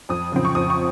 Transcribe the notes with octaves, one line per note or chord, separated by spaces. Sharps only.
F2 D#6
C#3 F3 C4
C#6
F2 D#6
C#6